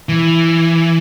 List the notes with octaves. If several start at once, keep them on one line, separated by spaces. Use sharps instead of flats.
E3